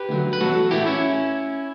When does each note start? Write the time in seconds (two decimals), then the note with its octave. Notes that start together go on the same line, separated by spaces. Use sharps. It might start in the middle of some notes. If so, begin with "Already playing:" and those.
Already playing: G4 B4
0.09 D2 D3 F#3
0.33 B4
0.41 E2 D3 F#3 A3 F#4 A4
0.71 A2 E3 A3 E4 G4
0.86 C#4 E4